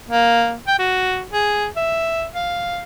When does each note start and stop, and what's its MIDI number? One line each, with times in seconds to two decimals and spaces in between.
0.09 0.55 58
0.67 0.78 79
0.79 1.23 66
1.32 1.68 68
1.76 2.25 76
2.35 2.83 77